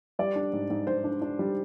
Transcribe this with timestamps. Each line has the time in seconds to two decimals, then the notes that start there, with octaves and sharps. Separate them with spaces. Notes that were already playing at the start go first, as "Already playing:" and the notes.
0.19 G3 D5
0.35 D4
0.53 G#2
0.70 G#2
0.87 G#2 C5
1.04 D4
1.22 D4
1.39 G3